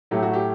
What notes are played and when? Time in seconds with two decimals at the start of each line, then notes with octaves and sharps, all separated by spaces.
0.11 A2 F#3 A3 G4
0.23 F#4
0.33 G4